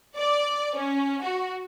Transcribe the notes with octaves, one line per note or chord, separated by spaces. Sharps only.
D5
C#4
F#4